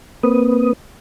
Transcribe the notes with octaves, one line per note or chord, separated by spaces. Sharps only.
A#3 C4 B4 D#6